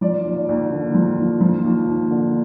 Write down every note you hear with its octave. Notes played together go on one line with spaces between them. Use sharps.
F3 D5
D#2
D5
D#2
D3
F3
D#2
F3
D#2
D#2
D3